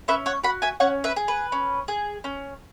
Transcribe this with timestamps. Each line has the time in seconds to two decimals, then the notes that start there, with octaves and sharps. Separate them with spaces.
0.08 C#4 B4 E5
0.26 C#5 F#5
0.43 F#4 F#5 B5
0.62 E5 G#5
0.80 C#4 C#5 F#5
1.04 B4 E5
1.16 G#4
1.28 B4
1.52 C#4
1.88 G#4
2.24 C#4